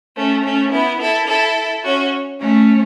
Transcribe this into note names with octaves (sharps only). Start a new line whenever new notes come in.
A3 C#4
A3 C#4
B3 E4
E4 A4
E4 A4
C#4 F#4
A3 C#4